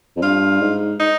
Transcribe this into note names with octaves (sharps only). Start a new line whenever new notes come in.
F2
G2 F4
G#2
D#4